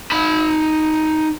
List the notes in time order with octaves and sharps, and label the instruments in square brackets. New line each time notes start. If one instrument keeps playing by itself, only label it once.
[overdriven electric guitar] D#4 B5